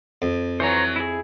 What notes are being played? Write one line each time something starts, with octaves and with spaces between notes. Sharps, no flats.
F2
E3 F#3 C5 C#5 A#5
E4 G#4